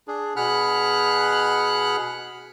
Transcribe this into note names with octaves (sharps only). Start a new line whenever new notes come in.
D4 G#4
B2 G#4 F#5 B5 F6 F#6